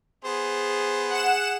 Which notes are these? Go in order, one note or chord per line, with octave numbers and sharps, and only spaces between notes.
B3 G#4 C5
F#5 E7